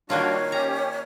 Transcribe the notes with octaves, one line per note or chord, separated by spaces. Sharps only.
D#3 G3 A#3 D4 F4 F#4 C#5
C#4 G4 A#5